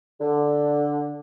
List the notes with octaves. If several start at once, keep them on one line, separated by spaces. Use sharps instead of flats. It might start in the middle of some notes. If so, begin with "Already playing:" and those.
D3